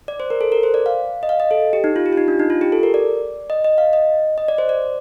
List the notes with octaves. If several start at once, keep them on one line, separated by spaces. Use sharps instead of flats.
D5
C5
A#4
A4
A#4
C5
D5
F5
D#5
F5
D#5
A4
G4
D#4
F4
G4
F4
D#4
D4
D#4
F4
G4
A4
A#4
D5
D#5
D#5
F5
D#5
D#5
D5
C5
D5